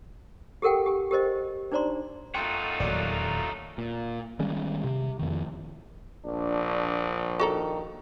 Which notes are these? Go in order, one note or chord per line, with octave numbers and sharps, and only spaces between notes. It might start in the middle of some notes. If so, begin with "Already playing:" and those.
G4 A4 A#4 F#5 G5
G4 G#5
G4 A#4 C5 D#5
D4 D#4 C5 D5 A#5 C6
F#2 A3 D#4 F4 F#4 G5 C6 C#7
D#1 E2 F#3 A#3 D5
A#2
D#3 G3 G#3 C#4
C3
F2 D#3
A#1 D4
D#3 F#4 A4 A#5